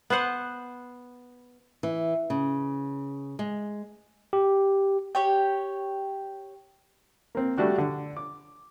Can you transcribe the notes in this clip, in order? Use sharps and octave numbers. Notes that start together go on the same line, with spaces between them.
B3 B4 C5 F#5
E3
C#3
G#3
G4
G4 C#5 G5
A#3 C4
G3 A3 D4 F#4 G4
D3
D6